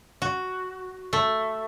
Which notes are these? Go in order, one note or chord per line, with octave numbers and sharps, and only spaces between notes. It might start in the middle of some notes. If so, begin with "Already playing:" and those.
F#4
A3